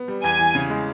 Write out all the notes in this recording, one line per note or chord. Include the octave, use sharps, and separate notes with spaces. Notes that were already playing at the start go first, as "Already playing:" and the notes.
Already playing: B3
G3
E2 G#5
E3
C#3
G#3